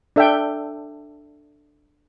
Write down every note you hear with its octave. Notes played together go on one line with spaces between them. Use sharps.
D4 A4 E5 G5